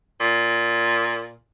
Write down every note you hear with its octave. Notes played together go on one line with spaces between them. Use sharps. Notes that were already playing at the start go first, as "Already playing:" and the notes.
A#2